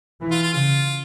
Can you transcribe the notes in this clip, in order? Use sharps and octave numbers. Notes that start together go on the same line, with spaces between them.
E3
F4
F4
C#3 F4